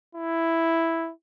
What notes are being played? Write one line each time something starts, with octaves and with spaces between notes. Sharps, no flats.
E4